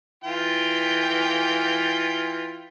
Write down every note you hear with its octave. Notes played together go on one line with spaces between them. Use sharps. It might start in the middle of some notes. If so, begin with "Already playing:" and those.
E3 F4 G5